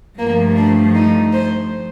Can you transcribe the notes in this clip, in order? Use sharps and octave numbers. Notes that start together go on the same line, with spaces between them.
G2 F3 A3 A#3
D4
D#4
C5